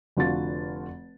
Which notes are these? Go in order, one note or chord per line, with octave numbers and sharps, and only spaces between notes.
F1 D3 F4 F#4 A6